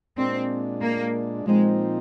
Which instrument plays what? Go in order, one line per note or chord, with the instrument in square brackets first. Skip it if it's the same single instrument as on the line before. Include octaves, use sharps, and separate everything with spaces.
[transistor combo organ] A#2 G#3 D4 [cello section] C4
[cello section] A#3
[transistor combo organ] A#2 F3 C4 D#4 [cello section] G#3